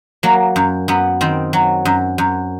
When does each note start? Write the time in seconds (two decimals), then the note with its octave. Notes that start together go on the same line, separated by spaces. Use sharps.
0.23 F#3 A#3
0.56 F#2
0.88 F#2 B3
1.21 D#3 C4
1.53 F#3
1.85 F#2
2.18 F#2